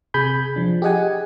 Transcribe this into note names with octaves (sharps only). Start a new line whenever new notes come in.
C3 G#4 G#5 B5 G6
F3 D4
G4 G#4 D#5 F#5 G#5